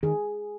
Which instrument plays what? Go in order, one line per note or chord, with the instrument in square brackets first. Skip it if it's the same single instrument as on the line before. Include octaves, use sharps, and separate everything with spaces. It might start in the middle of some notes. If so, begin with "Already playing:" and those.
[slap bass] D#3 [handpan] G#4